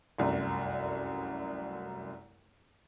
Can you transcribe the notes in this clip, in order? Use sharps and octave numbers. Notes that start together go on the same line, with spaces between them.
F1 C2 F#2